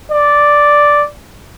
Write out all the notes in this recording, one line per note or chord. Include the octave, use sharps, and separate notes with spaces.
D5